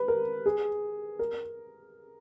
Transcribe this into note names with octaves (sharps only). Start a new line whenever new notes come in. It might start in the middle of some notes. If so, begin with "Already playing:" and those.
Already playing: B4
A#4
G#4
A#4